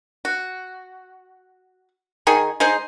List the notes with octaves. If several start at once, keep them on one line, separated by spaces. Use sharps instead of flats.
F#4
D#3 D#4 G#4 G#5
G#3 D#4 G#4 C5